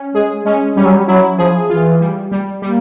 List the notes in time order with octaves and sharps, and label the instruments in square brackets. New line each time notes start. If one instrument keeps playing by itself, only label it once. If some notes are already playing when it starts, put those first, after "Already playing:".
Already playing: [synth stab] C#4
[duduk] G#3 [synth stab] G#4
[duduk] G#3 [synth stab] C#4
[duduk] G3 [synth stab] C#4
[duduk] F#3
G3
[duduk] F#3 [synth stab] E4
[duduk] F3 [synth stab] G#4
[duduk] E3 [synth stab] F4
[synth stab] G3
G3
[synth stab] G3 [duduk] A#3